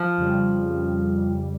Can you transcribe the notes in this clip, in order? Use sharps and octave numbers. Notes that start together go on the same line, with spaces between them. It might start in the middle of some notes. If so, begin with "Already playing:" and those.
Already playing: F3
F2 C#3 G3